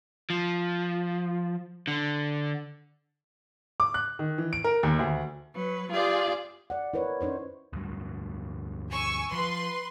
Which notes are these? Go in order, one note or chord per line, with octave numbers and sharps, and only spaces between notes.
F3
D3
D6
F#6
D#3
E3
D7
A#4
D#2
D2
F#3 B4
F4 G4 G#4 D5
D5 F#5
E4 A#4 B4 C#5
C#4 D#4 C5 C#5
D2 G2 F#3
G#5 C#6 E6
F3 B4 C6